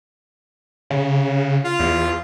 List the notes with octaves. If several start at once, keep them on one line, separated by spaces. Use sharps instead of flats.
C#3
F4
E2